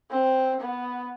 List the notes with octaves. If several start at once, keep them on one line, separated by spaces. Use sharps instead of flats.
C4
B3